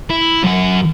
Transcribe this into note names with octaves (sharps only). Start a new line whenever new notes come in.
E4
F#2 F#5